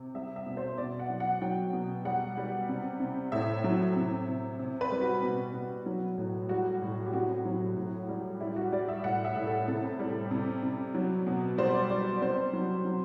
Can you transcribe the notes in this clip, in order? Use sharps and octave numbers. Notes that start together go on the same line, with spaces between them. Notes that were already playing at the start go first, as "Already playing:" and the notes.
Already playing: C3
G3 E5
E5
B2
C5
B2 D5
F#5
F#3
F#5
F#3 G5
B2
G3 F#5
G3
C3
C3
A2 E5
F#3
C3
C3
C3
B4
G3
F#4
B2
B2
F#3
A2
G3 F#4
A2
G4
C3 F#4
F#3
A2
G3
G3 E4
F#4
G3 D5
E5
A2 F#5
E5
A2
A4
C3 A4
G3
C3
C3
F#3
B2
G3 C5
D5
G3 D5
C3 C5
F#3
F#3